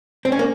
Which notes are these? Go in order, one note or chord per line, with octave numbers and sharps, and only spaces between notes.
C4
C#4
A#3